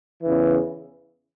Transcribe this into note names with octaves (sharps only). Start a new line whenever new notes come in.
E2 C#3 E3